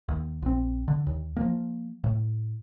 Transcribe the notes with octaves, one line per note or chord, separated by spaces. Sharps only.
D#2
A#1 C4
D3
D#2
F3 A#3
A2